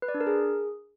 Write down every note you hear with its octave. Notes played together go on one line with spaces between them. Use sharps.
B4
D5
D4
A#4
G#4